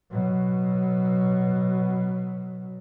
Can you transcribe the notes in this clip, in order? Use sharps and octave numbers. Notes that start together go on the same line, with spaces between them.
B2 F#3